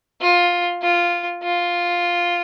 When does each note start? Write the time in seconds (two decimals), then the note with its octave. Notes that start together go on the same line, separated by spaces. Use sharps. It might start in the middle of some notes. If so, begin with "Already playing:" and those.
0.21 F4
0.82 F4
1.43 F4